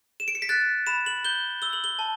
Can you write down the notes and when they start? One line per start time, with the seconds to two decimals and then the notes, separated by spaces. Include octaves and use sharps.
0.20 E7
0.28 D7
0.35 C#7
0.42 B6
0.49 F#6 A6
0.86 B5 E7
1.06 F#7
1.25 G6 G7
1.62 E6 G7
1.73 F#7
1.84 G7
1.99 A5